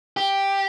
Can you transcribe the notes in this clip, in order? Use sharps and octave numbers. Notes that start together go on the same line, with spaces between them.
G4